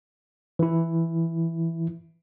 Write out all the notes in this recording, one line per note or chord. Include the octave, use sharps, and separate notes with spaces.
E3 E4